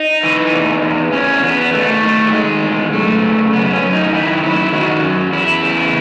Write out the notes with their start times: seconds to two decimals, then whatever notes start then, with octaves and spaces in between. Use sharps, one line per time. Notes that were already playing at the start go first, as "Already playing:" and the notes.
Already playing: D#4
0.23 E3
0.53 E2
0.83 E2
1.13 E2 C#4
1.43 E2 B3
1.73 D#3 A3
2.03 D#3
2.28 F#3
2.33 D#3 G#3
2.63 E2
2.93 F#2 A3
3.23 C#3
3.52 F#2 B3
3.73 C#4
3.83 F#2
3.93 D#4
4.13 D#3 E4
4.43 F#2 E4
4.73 D#3 F#4
5.03 F#2
5.33 E2 E4
5.63 C#3